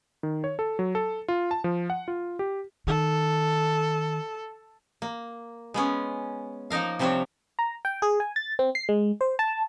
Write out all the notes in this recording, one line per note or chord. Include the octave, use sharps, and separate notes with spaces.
D#3
C#5
A4
F#3
A4
F4
A5
F3
F#5
F4
G4
D#3 A4
A#3
G#3 B3 C#4
F3 A#3 D#4 A#4 F5
C3 F3 G3 C4 D4 C#5
A#5
G5
G#4
G#5
A6
C4
C7
G#3
C5
A5